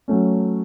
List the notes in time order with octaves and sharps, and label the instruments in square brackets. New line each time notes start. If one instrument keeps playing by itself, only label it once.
[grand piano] F#3 A3 C#4